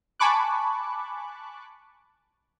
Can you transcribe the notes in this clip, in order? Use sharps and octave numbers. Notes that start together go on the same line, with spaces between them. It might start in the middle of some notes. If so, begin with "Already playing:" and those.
G#5 A5 B5 C#6 D6 F#6